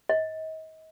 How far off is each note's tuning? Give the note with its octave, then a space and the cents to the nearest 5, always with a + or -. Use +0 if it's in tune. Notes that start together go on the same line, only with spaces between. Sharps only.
D#5 +35